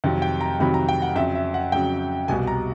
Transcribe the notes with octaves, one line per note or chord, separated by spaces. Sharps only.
F2 C3 D#3 F#3
G5
A#5
F2 C3 D#3 F#3 B5
A#5
G5
F#5
F2 C#3 F#3 E5
E5
F#5
F2 C#3 F#3 G5
C2 B2 G3 G#5
A#5